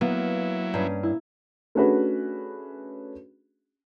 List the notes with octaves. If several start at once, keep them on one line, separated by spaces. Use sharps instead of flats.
F#3 A#3 B3 E4
G2 C#4 A#5
E4
A3 C#4 D4 F#4 G#4 B4